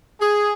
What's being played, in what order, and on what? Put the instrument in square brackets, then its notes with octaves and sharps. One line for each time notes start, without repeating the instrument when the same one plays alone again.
[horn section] G#4